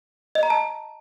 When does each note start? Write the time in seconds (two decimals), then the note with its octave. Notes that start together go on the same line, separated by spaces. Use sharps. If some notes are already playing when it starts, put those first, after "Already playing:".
0.35 D#5
0.43 A#5
0.50 A5